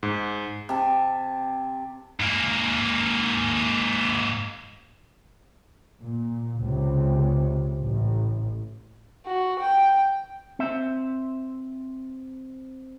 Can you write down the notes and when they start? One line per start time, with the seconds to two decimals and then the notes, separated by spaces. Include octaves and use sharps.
0.03 G#2
0.69 C3 A5
2.20 G#2 A#3
6.01 A#2
6.59 C#2 C3
7.82 A1
9.26 F#4
9.61 G5
10.59 C4 E5